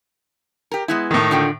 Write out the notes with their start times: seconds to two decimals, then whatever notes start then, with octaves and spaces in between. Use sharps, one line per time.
0.72 G4 A#4
0.88 G#3 B3 E4
1.11 A2 D#3
1.31 D3 F4 G5